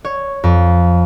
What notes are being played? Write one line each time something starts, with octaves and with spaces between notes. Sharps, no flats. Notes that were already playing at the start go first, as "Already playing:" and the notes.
C#5
F2